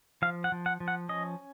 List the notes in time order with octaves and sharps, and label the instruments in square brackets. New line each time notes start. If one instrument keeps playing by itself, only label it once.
[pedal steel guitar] F3 F5
F#5
F3
F#5
F3
F#5
C#4 D#5